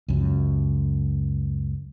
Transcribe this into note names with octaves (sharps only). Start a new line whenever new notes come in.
C#2 F#2